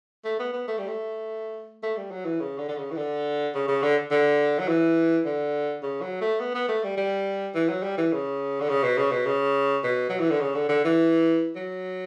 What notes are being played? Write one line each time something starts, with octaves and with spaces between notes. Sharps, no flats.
A3
B3
B3
A3
G3
A3
A3
G3
F#3
E3
C#3
D3
D3
C#3
E3
D3
C#3
C#3
D3
D3
F#3
E3
D3
C#3
F#3
A3
B3
B3
A3
G3
G3
E3
F#3
G3
E3
C#3
D3
C#3
B2
C#3
B2
C#3
B2
F#3
E3
D3
C#3
D3
D3
E3
F#3